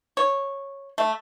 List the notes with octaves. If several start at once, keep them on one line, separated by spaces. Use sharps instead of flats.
C#5
A3